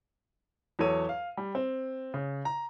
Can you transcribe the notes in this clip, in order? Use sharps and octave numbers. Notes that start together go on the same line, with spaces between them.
E2 F#3 A4 C#5 D#7
F5
G3
C4
C#3
A#5